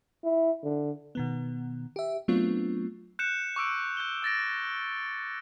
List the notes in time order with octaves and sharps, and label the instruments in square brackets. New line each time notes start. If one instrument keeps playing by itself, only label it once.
[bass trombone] E4
D3
[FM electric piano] B2 D#3 B3
G4 E5
F#3 A3 B3 C4 D4 F4
[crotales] F#6 G6 C#7 E7
C#6 D6 E6 D7
G6 G7
E6 A6 A#6 D7